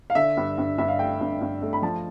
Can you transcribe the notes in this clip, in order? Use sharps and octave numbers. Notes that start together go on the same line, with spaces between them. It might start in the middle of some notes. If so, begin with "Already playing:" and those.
F5
D3 E5
G2
G2
G2 E5
F5
A3 G5
G2
G2
A3
B5
F3 A5